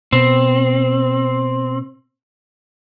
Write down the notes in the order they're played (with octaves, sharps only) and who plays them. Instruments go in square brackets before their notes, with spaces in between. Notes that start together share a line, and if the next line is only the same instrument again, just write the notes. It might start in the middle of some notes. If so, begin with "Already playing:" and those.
[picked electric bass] B2 [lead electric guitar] C4